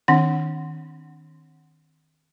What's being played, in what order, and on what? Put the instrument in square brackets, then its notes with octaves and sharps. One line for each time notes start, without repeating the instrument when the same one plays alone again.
[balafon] D#3 C4 D4 F#5